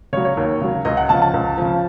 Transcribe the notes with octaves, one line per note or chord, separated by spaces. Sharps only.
C#3 F#3 C#5
C#5
D#2
C#3 F#3
C#2 D#5
F#5
C#3 F3 A5
A5
C#2
C#3 F3